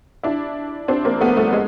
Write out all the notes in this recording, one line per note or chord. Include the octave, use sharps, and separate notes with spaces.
D4 E4
C4 D4
A#3 C4
A3 B3
G3 A3
G#3